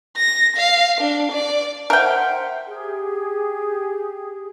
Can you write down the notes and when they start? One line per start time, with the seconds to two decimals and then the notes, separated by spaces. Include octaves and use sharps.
0.17 A#6
0.56 F5
1.01 D4
1.32 D5
1.90 A#4 C5 E5 F#5 G5
2.67 G4 G#4